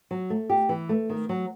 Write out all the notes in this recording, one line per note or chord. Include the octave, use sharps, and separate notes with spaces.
F#3
A3
G4
E3
A3
D#3
F#3